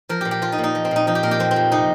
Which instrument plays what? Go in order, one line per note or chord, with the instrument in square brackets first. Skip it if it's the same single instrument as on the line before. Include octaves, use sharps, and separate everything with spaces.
[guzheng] F3 A#4
A#2 G4
G4
F3 F4
D#4
A#2
D#4
F3
C4
A#2 D#4
F3 D#4
G4
A#2 A#4
G4
F2 C4
C4
F2
C3 D#4